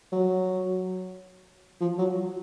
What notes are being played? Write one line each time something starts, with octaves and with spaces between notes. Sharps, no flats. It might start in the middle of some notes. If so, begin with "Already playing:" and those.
F#3
F3
F#3